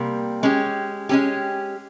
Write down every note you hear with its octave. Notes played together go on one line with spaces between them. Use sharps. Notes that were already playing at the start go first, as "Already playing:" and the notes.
Already playing: C3 G3 A#3
G#3 C#4 G4
G#3 C#4 G4